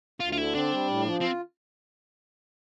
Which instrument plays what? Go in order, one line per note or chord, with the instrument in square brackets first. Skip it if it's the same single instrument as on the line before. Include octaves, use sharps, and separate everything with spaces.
[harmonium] D2 [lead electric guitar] F4
[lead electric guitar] F4
[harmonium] D3 [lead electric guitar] E4
[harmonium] C4 [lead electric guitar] D4
[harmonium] G3
A2
F3
[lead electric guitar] C4 [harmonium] F4